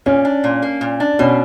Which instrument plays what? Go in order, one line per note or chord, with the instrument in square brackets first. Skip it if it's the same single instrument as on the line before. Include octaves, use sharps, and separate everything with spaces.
[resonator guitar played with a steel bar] A#2 [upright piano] C#4
[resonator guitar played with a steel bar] D4
A#2
A#3
A#2
D4
[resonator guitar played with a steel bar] B2 [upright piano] C#4